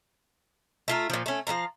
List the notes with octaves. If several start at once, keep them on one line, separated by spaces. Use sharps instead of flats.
A3 F4 A#5
A#2 F3
A3 C#4
F3 A3 F5 A#5